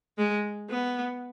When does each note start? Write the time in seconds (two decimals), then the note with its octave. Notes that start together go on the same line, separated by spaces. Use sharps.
0.18 G#3
0.70 B3